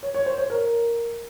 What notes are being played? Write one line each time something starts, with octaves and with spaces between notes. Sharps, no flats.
C#5
C#5
C5
C#5
A#4